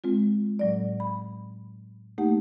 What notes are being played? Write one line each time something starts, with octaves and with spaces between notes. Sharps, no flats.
G#3 C4 F4
A2 F#3 D5
B5
A3 A#3 D#4 G4 F#5